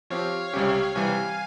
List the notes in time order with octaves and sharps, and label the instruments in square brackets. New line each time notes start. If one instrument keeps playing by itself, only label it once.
[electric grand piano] F3 C4 G4 [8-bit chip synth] C#5 F5
[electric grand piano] C#2 C3 G3 C#4 G4
[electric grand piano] C3 E3 G3 [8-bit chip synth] F5 G#5